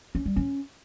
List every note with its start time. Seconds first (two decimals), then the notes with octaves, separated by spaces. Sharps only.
0.15 C#4
0.26 G3
0.36 C#4